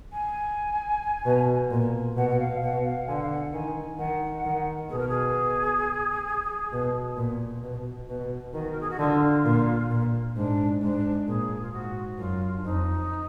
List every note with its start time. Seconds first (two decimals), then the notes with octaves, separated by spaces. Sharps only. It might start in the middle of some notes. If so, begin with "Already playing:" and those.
0.12 G#5
1.26 B2
1.71 A#2
2.16 B2 F#5
2.30 F#5
2.40 F5
2.62 B2 F#5
2.84 F5
3.07 D3 G#5
3.15 F#5
3.23 F5
3.31 F#5
3.53 D#3 G#5
3.99 D#3 F#5
4.45 D#3
4.90 B2 G#4
4.99 A#4
5.09 G#4
6.72 B2
7.17 A#2
7.62 B2
8.09 B2
8.53 D#3 F#4
8.71 A#4
8.81 G#4
8.90 F#4
8.99 D3 F4
9.45 A#2
9.90 A#2
10.36 G#2 D4
10.81 G#2 D4
11.27 A#2 G#4
11.62 F4
11.73 G#2 F#4
12.18 F#2 F4
12.57 D4
12.64 F2 D#4